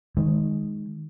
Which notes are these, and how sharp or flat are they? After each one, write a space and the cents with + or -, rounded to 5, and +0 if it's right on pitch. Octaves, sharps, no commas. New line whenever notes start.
D#3 +0 G#3 +0